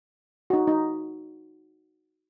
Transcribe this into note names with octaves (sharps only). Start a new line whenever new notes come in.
D#4 F#4
D#4